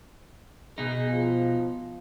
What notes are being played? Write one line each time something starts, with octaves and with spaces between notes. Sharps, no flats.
B2 D#4 G#4
F3